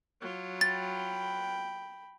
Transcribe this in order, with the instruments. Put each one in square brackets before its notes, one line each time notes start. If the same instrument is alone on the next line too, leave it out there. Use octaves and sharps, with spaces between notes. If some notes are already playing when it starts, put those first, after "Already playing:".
[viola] F#3 F4
[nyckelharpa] G5 B5 [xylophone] A6